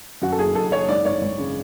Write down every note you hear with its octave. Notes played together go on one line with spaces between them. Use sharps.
F#2 F#4
A4
F#1 G#4
F#1 A4
F#1 C#5
G#1 D5
G#1 C#5
G#1
C#3